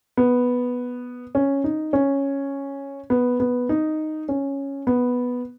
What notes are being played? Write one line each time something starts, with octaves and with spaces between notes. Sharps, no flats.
B3
C#4
D#4
C#4
B3
B3
D#4
C#4
B3